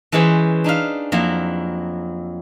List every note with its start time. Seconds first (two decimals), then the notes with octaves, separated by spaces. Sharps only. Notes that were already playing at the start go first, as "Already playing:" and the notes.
0.12 E3 G#3 C#4 G#4 B4 C5
0.64 D4 D#4 E5 F5
1.12 F2 F#3 A#3 E4